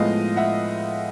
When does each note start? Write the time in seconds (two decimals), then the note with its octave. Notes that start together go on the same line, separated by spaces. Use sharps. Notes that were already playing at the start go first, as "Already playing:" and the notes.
Already playing: A2 F3 G#3 B3 D#5 F5
0.36 E5 F#5